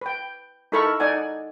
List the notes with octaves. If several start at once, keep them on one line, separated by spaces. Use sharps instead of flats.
B4 G5
D#4 E4 A4 A#4 B5 C#6
D#4 D5 F#5 G#5